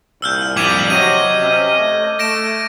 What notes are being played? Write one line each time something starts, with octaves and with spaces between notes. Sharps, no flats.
C2 A#2 E6 F6 G6
F2 G3 D6 G#6 D#7
C3 F#3 D#5 D#7
C3 C#4
A3
A3 A#6 D7 E7